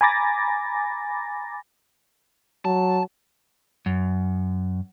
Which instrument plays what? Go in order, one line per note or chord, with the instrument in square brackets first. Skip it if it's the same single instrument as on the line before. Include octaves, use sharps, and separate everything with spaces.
[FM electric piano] G#5 A#5 B5 D6 A6 A#6
[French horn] F#3 [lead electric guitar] A5
[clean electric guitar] F#2